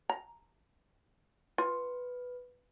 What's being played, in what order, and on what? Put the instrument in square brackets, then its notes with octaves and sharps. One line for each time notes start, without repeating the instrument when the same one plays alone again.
[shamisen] A#5
[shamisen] F4 [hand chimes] B4